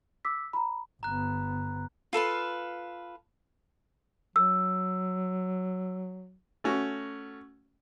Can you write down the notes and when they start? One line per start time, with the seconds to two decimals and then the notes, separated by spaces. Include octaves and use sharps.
0.25 D6 E6 B6
0.53 A#5 B5
1.03 G1 B3 A#5 F#6
2.13 F4 A4 B4 F5
4.36 F#3 E6
6.64 A3 C#4 F#4